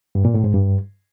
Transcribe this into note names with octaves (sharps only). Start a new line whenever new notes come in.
G2
A#2
A2
G#2
G2